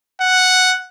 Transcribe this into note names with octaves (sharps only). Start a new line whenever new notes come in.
F#5